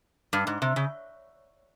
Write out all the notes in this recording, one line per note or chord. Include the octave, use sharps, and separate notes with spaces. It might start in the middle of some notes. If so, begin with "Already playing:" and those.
G2
G#2
C3
C#3